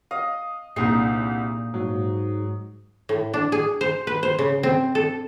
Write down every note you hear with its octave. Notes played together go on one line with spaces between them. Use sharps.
D#5 F5
C2 A#2 D4 D#4 G#4 C7
G#2 F#3
A2
D4
G#4
C5
B4
C5
C#3
C4
A4